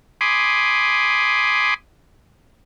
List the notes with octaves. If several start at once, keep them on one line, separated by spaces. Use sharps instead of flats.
G#5 B5 C6 D6 D#6